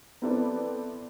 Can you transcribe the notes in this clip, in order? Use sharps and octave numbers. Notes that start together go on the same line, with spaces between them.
B3 C4 E4 A4 B4 D5